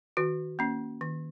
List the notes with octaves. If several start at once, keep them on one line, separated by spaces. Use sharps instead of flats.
D#3 F#4
A#3 C#4
D#3